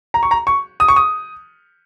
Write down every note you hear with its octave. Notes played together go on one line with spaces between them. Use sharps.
A#5
C#6
A#5
C#6
D#6
C#6
D#6